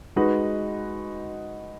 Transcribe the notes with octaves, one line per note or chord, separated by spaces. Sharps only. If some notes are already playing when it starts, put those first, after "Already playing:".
G#3 D#4 F#4 B4